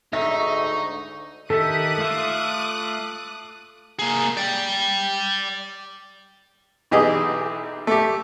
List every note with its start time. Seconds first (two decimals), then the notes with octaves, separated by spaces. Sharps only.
0.13 D2 G#2 D3 D#4 E5 C#6 A#6
1.50 D#3 G4 A4 E5 D6 D#6 F#6
1.98 A3 F4 E5
3.99 A#3 G#4
4.37 D5 G5
6.91 B1 E3 G4 G#4 D#5
7.87 A3 G4